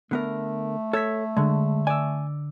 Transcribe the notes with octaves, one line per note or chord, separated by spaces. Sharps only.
D3 A3 B3 A#4
A4 C#5 E6 G#6 B6
D3 G#3
D5 G#5 E6